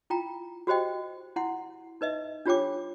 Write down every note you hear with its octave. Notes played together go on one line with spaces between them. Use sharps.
E4 F4 G5 A#5
F#4 G4 C5 D#5 G5
E4 F#5 C6
D#4 B4 D#5 E5
D4 F4 G4 C#5 G5 D6